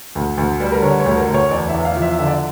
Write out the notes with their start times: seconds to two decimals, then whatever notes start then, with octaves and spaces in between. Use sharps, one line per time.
0.15 D2
0.38 D2
0.60 G3
0.72 A#4
0.83 D3 C#5
1.00 C#5
1.06 D2
1.17 A#4
1.28 D2
1.34 C#5
1.51 E2 D5
1.69 E5
1.74 E2
1.85 F5
1.97 F3
2.02 E5
2.19 D3 E5
2.28 D5